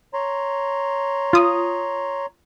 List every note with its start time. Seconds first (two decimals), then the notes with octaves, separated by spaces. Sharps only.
0.14 C#5 A#5 C6
1.33 F4 D#6